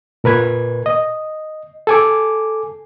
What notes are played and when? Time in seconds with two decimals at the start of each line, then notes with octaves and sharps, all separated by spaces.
0.24 A#2 A#4 B4 G#6
0.86 D#5
1.87 A4 G#5 D6